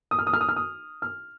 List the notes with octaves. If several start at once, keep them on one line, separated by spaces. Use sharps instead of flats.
D#6
F6
D#6
F6
D#6
F6
D#6
F6